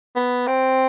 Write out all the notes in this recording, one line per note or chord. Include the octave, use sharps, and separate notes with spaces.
B3
C4